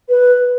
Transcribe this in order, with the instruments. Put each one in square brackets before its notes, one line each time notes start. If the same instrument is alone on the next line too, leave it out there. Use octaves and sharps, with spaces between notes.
[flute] B4